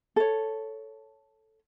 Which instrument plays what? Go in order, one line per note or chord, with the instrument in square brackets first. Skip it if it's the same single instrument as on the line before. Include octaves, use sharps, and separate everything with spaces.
[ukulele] A4 C#5